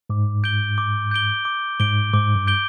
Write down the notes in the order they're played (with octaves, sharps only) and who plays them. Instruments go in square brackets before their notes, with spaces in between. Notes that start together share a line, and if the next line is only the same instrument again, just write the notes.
[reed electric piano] G#2 [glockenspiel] D6
[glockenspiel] G6 D7 G7
D6
G6 D7 G7
D6
[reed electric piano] G#2 [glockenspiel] G6 D7 G7
[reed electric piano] G#2 [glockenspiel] D6
[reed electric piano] G2
[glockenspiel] G6 D7 G7